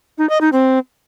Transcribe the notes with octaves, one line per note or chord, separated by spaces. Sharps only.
D#4
D#5
D#4
C4